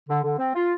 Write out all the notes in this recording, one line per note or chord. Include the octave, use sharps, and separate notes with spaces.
D3
D3
C4
F4